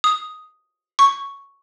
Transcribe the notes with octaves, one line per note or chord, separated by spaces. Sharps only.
D#6
C#6